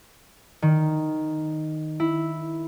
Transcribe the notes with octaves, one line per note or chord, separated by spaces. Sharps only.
D#3
E4